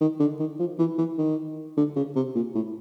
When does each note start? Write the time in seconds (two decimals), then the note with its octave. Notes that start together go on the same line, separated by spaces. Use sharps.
0.01 D#3
0.20 D3
0.39 D#3
0.59 F3
0.79 E3
0.98 E3
1.18 D#3
1.77 D3
1.96 C#3
2.16 C3
2.35 A#2
2.55 A2